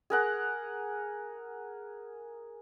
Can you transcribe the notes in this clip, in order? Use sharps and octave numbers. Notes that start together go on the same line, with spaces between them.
G#4 A#4 F#5